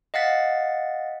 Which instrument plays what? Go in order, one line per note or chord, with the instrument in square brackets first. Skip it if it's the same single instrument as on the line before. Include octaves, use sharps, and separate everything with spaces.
[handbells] D#5 F5 F#5 A6 B6